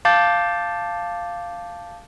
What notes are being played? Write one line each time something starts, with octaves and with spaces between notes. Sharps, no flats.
F5 A5 D6 G6 A6